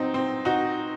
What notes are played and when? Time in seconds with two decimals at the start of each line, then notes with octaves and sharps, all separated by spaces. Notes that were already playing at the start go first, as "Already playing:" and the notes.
Already playing: F#3 C4 D#4
0.14 C4
0.45 D#4 F#4